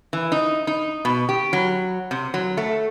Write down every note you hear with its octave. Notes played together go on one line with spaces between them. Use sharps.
E3
D#4
D#4
B2
G4
F#3
C3
F#3
A3